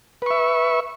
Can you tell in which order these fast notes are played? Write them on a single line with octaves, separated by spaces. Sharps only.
B4 C#6 E5